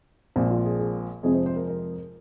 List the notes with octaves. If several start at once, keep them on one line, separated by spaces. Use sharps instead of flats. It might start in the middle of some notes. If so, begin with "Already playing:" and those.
A#1 A#2 F3 G#3 C4 C5
F4
G#4
G#4
F2 C3 F3 G#3 C4 G#4
C5
C5
A#4
A#4